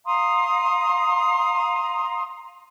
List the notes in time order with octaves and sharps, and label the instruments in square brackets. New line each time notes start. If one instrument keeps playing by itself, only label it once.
[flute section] F5 A#5 C6 D#6